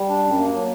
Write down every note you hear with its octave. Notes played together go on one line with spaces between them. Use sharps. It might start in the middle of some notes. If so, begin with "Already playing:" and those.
Already playing: G3
D4
F#2
A#3
F#3